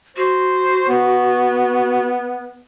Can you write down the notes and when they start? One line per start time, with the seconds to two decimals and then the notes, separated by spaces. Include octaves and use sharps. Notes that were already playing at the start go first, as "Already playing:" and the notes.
0.17 F#4 C5
0.89 B3